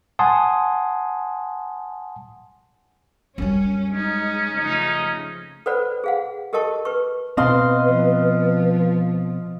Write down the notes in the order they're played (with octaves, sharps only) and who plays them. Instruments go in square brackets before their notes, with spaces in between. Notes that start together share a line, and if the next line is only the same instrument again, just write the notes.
[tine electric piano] F#5 G#5 A5 C6 D#6
[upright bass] F#2 G3 [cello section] C#4
[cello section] G#3 D#4 [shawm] C#4
[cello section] C#3 F3 A3 [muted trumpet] D#4
[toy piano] A4 B4 C5 D5 F#5 B5
G#4 F5 F#5
G4 A4 A#4 D#5 A5 C#6
B4 C#6
[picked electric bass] B2 C4 [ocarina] B4 [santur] D#5 F5 C6
[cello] F3